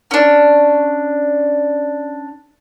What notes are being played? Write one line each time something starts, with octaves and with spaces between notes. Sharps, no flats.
C#4 D4